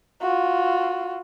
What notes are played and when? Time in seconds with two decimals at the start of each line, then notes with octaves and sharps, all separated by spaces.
0.21 F4 F#4